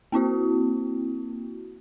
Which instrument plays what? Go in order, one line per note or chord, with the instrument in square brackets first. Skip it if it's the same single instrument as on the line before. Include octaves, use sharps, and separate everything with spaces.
[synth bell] A#3 C4 E4 F#4